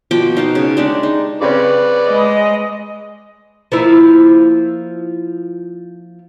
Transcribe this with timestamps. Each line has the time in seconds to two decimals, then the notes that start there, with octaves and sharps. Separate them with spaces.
0.11 B2 F3 G5 D6
0.37 D#4 F5 A5
0.55 C#3
0.77 G#3 D4 G4
1.03 D#4
1.41 C#3 C4 C#4 B4 D5
2.08 G#3 D#5
3.72 F3 A#3 E4